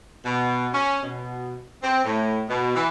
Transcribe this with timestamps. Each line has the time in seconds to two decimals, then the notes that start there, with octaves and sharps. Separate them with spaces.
0.24 B2
0.73 C#4
1.03 B2
1.83 C4
2.05 A2
2.48 B2
2.75 E3